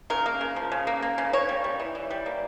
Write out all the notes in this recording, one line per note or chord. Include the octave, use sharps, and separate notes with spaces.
C#3 A#4
A#3
C#3
F3
C#3
A#3
A#3
C#3
A#3 C#5
G3
G3
E3
E3
G3
A#3